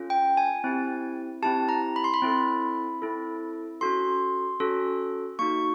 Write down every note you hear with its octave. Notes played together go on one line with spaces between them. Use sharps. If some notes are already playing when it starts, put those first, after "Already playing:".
Already playing: C#4 F4 A4
G5
G#5
C4 E4 G4
C4 E4 G4 A5
A#5
B5
C6
B5
C4 E4 A4
C4 E4 A4
C#4 F#4 A4 C6
C#4 F#4 A4
A#3 D#4 F#4 C#6